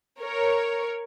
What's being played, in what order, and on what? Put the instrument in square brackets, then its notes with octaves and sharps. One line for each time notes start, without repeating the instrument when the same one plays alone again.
[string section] A#4 C#5